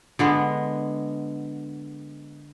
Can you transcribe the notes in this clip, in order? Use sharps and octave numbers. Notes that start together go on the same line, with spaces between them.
D3 G#3 B3